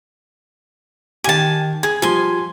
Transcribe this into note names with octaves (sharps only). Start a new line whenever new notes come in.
D#3 G4 G#5 A5
G#4 G#6
F3 G3 G#5 C6